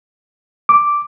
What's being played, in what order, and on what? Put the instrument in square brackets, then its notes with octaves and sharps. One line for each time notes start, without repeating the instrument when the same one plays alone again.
[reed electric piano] D6